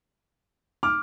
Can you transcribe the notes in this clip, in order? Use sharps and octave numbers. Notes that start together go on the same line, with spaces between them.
D6 F6